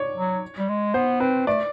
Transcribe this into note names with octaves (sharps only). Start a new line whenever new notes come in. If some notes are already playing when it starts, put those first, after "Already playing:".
Already playing: C#5 D5
F#3
G3
G#3
B3 C5
C4 B4
A3 D5